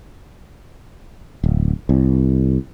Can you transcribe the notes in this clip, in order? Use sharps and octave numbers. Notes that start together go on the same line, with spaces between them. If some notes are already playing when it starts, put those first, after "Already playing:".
D1
C2